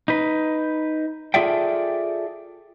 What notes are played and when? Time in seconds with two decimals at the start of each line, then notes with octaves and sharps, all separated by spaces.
0.08 D#4 B4
1.34 F4 G#4 A4 D5 E5 G5